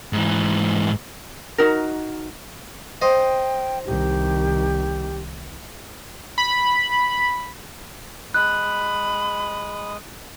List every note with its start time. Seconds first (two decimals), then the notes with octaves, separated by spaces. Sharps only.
0.13 G#2 E3
1.58 D#4 F#4 A#4
3.02 C5 D#5 G5
3.86 C2 D#3 G4
6.38 B5
8.34 G#3 B5 D#6 F#6